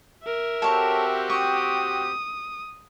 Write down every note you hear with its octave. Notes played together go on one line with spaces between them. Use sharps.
A#4 E5
C4 F#4 G4 A4 C#5
C#6 D#6